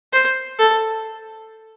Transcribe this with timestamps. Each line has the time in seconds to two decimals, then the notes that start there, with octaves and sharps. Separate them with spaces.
0.13 C5
0.59 A4